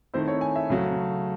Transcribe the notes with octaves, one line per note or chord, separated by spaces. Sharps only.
D#3 A3 C4 E4 C5
C#5
G#5
E5
C#3 F#3 A3